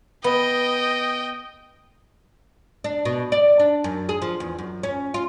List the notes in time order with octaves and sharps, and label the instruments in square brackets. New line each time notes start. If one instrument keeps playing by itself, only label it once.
[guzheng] B3 [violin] D#5 G5
[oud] D4
B2
D5
D4
F#2
G#4
F3
E2
F#2
C#4
F4